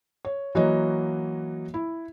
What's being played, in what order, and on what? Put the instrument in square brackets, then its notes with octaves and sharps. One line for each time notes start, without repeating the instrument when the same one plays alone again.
[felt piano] C#5
E3 F#3 A#3 F#4 C#5 D#5
E4